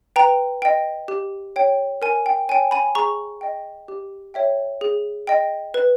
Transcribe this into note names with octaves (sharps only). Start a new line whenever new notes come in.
B4 G5 A#5
D#5 G5
G4
C#5 G5
A#4 G#5
G5
C#5 G5 G#5
G#5 B5
G#4 A#5 C#6
D#5 G5
G4
C#5 E5 G5
G#4
D#5 G5
B4